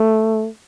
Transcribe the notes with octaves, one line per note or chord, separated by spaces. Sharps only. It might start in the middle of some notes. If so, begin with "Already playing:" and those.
Already playing: A3